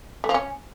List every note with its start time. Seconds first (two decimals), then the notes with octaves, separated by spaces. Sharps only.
0.24 A3
0.29 F3
0.34 C#4